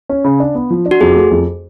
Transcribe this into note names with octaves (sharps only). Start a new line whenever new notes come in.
C#4
C#3
D4
B3
F3
D4
F#4
F2 G#4
A3
F2